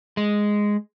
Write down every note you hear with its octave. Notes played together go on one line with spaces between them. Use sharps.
G#3